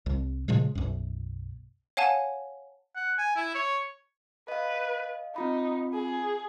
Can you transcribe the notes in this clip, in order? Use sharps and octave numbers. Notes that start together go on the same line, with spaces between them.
C2
A#2 C#3 F3 G#3
B1 F#2
C#5 F5 F#5 G#5 A5
F#5
G#5
E4
C#5
B4 D#5 F5
C4 D#4 F4 B5
G#4